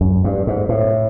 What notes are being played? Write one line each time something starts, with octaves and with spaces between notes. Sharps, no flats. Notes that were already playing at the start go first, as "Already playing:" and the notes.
F#2
G2
G#2
A2